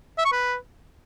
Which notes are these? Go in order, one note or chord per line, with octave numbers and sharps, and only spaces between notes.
E5
C#6
B4